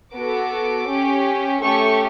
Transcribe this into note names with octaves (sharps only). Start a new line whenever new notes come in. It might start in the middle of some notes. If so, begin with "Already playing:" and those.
B3 F#4 A4 D6
C#4 G4
A3 C#4 G4 C#6